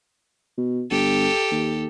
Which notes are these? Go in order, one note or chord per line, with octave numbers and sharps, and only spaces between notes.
B2
G1 G4 A4
D#2